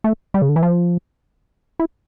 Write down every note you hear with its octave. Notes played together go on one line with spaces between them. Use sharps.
A3
G3
C#3
D3
E3
F3
E4